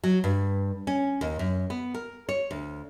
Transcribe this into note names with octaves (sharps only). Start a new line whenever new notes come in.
F#3
G2
C#4
D#2
F#2
B3
A#4
C#5
D2